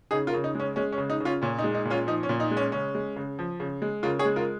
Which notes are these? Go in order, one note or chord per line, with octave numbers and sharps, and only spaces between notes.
C#3 D#4 G#4
F4 A#4
C#3
D#4
G#3 C#4
G#3 C#4
C#4
C#3
D#4
C#3
C#4 F4
A#2 C#4
D#4
G#3
D#4
A#2
C#4 F4
F3 D#4
C#4
A#2
D#4
G#3
C#4
C#3 C#4
G#3
C#3
F3
C#3
G#3
C#3 F4 A#4
G#4 C#5
G#3
F4 A#4